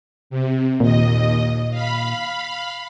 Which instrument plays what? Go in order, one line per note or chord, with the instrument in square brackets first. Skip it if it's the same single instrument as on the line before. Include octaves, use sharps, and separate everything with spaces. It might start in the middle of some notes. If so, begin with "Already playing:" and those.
[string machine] C3
[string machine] D#2 D#5 [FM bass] A#2
[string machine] F5 B5